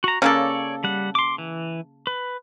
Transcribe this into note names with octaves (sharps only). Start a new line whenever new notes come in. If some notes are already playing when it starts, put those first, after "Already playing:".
F#4 A#5
C#3 A#3 A4 C#5 D5
G3 F#5
C6 D6
E3
B4